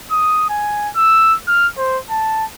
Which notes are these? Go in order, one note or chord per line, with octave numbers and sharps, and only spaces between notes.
D#6
G#5
E6
F6
C5
A5